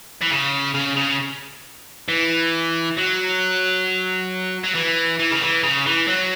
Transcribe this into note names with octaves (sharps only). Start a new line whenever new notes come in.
E3
C#3
C#3
C#3
E3
F#3
F#3
E3
E3
C#3
E3
C#3
E3
F#3